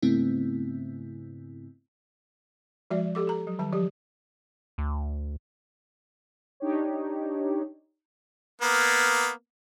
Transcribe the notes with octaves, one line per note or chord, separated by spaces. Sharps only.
G#2 C#3 A3 B3 C4 E4
F3 G#3 F#4 D5 E5
G4 A4 D6
A4 A#5
F#3
D#3 G3 A5
F3 F#3 G4
D2
D4 D#4 G4 C#5
A#3 B3